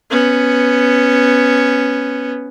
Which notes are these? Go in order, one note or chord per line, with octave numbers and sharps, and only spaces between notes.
B3 C#4